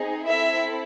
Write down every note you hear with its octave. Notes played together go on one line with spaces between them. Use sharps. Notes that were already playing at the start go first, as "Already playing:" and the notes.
Already playing: C4 D#4 G#4
C4 E4 A4 E5